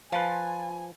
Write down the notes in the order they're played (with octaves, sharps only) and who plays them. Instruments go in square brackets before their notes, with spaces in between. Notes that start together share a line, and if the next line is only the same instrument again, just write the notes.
[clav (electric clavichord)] F3 B4 [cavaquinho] F4 A5 C6 [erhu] G#5